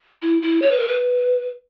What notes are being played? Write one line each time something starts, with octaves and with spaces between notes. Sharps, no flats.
E4
E4
C#5
B4
A#4
B4